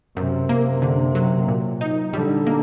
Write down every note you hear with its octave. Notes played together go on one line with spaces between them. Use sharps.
F#2 C3
A#3
D3
F#3
A#2
D#4
D3 G3
A#3